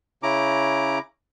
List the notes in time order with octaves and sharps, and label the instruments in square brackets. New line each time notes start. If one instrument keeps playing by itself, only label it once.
[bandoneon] C#3 C#4 E4 A#5 D6